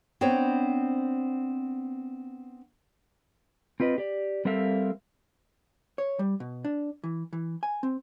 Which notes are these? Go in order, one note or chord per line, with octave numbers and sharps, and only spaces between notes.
B3 C4 D4 C5 C#5
C4 F4 B4 D#5
G4 D5
G3 C4 A4 A#4 E5 F5
C#5
G3
B2
D4
E3
E3
G#5
C4